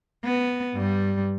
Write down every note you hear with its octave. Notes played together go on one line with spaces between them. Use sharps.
B3
G2 G3